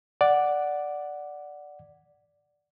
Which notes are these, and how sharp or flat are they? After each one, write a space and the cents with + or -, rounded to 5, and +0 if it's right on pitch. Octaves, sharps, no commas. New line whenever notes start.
D5 +0 F#5 +0